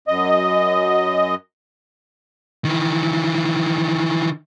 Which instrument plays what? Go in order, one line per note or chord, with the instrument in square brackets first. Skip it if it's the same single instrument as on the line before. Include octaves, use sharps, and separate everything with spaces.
[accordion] F#2 D#5
[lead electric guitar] D#3 E3